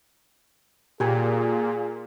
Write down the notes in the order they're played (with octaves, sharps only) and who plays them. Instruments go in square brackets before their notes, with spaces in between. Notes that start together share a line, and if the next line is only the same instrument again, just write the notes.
[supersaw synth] A#2 [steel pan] G4 G#5 [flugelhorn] G#4